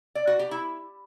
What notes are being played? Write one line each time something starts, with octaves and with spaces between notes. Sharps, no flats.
D5
F#4
G4
E4